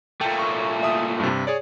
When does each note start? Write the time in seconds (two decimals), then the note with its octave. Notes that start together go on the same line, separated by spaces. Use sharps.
0.21 A#2 A3 G5
0.39 C#6
0.83 E5 D#6
1.20 G2 C3
1.47 G#4 C#5 D5